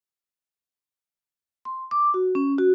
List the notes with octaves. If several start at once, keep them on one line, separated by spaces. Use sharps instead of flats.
C6
D6
F#4
C#4
F#4